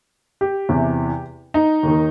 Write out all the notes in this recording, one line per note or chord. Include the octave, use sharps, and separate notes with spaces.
G4
E2 C3 E3
D#4
D#2 D#3